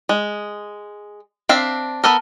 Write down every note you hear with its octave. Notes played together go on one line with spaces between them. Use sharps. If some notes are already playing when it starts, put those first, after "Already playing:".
G#3
C4 D4 E5 F5
B3 A4 A#4